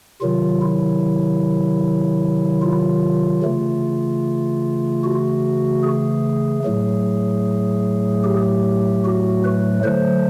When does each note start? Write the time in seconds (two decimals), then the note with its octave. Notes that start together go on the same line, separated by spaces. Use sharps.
0.21 C3 D#3 F#3 F4
0.62 E4
2.62 F4
3.42 C#3 E3 A3
5.04 F#4
5.83 G#4
6.64 A2 F#3 A3
8.24 G4
9.05 F#4
9.44 B4
9.84 D3 F#3 A3 C5